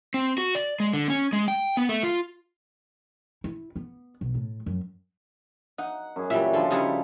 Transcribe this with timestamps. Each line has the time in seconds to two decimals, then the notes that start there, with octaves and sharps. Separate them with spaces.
0.14 C4
0.38 F#4
0.55 D5
0.80 G#3
0.94 D3
1.10 C#4
1.33 G#3
1.48 G5
1.77 B3
1.89 A3
2.03 F4
3.44 E4
3.76 B3
4.21 B1
4.35 A2
4.66 F#2
5.78 D#4 F#5
6.16 F#2 G#4
6.30 A#2 E3 G3 E5
6.53 D3 F3 A4 B5
6.70 C#3 G3 D#4 E4 F#5